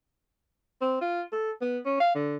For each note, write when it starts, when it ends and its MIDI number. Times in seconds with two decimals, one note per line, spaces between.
0.81 0.99 60
1.01 1.22 65
1.32 1.51 69
1.61 1.79 59
1.86 1.95 61
2.00 2.12 77
2.15 2.37 50